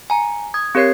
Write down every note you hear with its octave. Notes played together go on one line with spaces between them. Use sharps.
G#5 A#5
D#6 G#6
C4 G4 A#4 C#5 G#6 C7